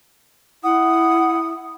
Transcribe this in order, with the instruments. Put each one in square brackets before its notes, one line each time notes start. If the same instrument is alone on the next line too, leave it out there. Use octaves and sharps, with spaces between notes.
[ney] E4 [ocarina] F#5 [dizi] D#6